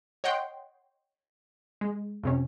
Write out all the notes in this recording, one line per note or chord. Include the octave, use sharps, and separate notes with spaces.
C#5 D#5 F#5 G5 C6
G#3
F2 C3 C#4